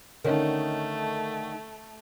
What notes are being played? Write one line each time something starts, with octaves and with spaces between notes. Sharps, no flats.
D3 D#3 A3 C#4 D#4